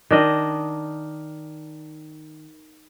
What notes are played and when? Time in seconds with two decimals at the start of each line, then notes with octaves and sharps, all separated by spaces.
0.11 D#3 D4 D#5